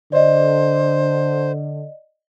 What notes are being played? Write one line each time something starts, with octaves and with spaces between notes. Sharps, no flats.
D3 C5 D5 D#5